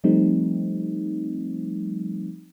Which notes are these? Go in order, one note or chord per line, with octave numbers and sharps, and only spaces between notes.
F3 G3 A3 C4 D#4